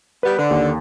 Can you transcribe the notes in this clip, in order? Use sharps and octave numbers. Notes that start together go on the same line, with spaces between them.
G3 B3 B4
D3
D#2